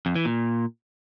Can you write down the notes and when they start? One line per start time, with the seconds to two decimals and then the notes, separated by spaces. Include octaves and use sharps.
0.06 F2
0.15 E3
0.25 A#2